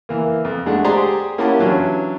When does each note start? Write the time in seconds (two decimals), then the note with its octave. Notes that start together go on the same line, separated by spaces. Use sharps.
0.09 E3 A#3
0.45 F2
0.66 G#3 A3 D4 F#5
0.84 G4 G#4 C5 D5 A#5 C6
1.38 A#3 C#4 E4 G4 F#5 A5
1.59 E3 F#3 C#4 D4